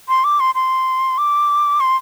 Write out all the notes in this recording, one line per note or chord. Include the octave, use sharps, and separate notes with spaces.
C6
D6
C6
C6
D6
C6